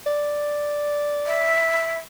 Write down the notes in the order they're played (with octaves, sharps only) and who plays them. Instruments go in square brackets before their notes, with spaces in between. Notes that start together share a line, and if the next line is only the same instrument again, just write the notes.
[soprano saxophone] D5
[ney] E5